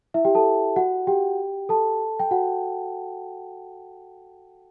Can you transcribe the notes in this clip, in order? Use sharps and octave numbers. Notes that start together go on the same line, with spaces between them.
E4 E5
G4 G5
A4 A5
F#4 F#5
G4 G5
A4 A5
G5
F#4 F#5